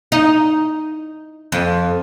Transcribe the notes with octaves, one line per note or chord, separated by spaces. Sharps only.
D#4
F2